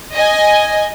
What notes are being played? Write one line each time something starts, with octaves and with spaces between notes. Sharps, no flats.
D#5 G#5